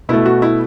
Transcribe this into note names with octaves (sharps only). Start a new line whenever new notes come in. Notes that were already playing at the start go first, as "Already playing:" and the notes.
B2 A3 E4
F#4
E4